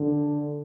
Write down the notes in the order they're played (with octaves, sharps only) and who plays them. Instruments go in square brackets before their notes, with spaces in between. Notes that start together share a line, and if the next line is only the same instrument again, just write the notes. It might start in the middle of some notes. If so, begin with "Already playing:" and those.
Already playing: [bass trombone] D3